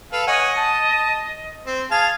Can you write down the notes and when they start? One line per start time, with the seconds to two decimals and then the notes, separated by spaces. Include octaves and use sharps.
0.13 A4 B4 F5
0.27 C#5 D#5 F#5 G#5
0.57 A5
1.66 C4
1.91 G#4 F5 A5 G#6